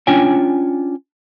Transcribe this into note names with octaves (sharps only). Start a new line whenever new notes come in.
C#4 D4 F4 C#5 G5 G#5